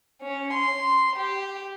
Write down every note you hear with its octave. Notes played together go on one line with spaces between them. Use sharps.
C#4
C6
G4